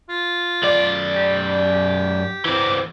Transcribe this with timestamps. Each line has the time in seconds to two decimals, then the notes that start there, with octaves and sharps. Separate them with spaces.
0.09 F4
0.63 F#2 D5
1.15 G4
2.45 E3 C4 D6